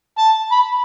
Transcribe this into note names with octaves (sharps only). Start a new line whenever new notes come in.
A5
B5